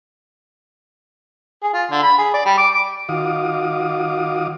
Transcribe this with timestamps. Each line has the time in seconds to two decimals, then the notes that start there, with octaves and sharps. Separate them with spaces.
1.63 G#4
1.74 F4
1.91 D3
2.03 B5
2.18 G#4
2.34 D5
2.46 G3
2.58 D6
2.75 D6
3.09 D#3 F4 F#4 F5 D6 D#6